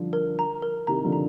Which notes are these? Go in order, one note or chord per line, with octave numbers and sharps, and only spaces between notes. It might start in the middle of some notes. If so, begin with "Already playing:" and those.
Already playing: D3 F3 G3
A#4
A#5
A#4
C3 D#3 A#5
D3 F3
A#5